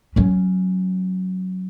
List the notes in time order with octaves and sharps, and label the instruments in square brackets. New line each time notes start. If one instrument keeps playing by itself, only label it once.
[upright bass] F#3 C#4